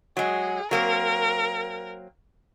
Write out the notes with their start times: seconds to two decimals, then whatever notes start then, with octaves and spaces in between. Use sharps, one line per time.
0.17 F#3 G#3 G#4
0.71 F#3 A#3 C4 A#4